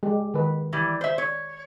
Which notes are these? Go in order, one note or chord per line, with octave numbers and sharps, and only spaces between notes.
G#3 G4
D#3 B4
E3 G3
C5 E5
C#5